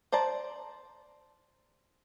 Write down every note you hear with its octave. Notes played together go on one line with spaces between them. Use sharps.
C5 D5 A5 A#5